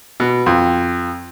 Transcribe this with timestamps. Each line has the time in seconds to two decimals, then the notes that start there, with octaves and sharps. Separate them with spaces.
0.20 B2
0.46 F2